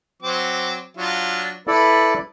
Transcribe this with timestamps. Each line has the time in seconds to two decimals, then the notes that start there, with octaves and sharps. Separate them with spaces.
0.22 F#3 C4 D6
0.97 F#3 D4 F4
1.67 E4 A4 B4 D5